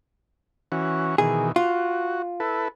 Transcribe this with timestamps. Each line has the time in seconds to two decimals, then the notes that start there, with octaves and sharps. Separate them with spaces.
0.72 E3 C#4 F#4
1.18 B2 D#3 E3 G#4
1.56 F4 F#4
2.40 E4 A4 B4